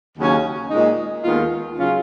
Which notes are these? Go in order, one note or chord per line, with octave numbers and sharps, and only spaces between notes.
D#2 C#3 F#3 C#4
A#2 G#3 D#4
D#2 D#3 G#3 B3 F4
C#3 F#3 C#4 F4